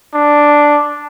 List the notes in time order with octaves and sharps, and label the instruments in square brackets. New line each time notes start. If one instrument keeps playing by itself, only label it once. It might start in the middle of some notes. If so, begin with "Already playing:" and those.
[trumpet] D4